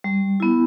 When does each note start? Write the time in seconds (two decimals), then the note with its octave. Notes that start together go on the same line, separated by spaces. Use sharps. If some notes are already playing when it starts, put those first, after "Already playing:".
0.04 G3
0.40 B3 E4